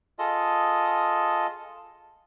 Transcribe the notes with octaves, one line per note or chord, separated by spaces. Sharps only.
F4 G#4 A4 D#5